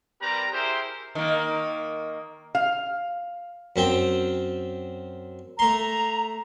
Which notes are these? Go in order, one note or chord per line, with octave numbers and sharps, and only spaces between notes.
G3 C4 G4 A#4 B4 A#5
E4 G4 G#4 A#4 C5
D#3 A#3
F5
F#2 C4 G5
A3 A#5 C6